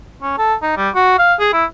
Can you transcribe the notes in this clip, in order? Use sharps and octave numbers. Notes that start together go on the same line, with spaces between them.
C#4
A4
D#4
G3
F#4
F5
G#4
E4